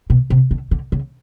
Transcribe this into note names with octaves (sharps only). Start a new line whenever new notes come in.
B2
C3
D3
D3
C#3